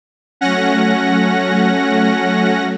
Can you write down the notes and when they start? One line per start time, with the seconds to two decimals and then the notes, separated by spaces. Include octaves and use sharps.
0.41 F#3 A3 C#4 F#5 A#6